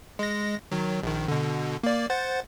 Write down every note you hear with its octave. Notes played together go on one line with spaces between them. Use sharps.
G#3 A#6
D#3 F#3
A#1 D#3
B2 D3
A#3 D5
C5 F#5 A6